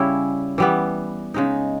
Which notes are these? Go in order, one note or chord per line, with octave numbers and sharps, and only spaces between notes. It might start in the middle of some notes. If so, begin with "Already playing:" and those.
Already playing: C#3 G3 C#4 E4
E3 G3 B3
C#3 G#3 D#4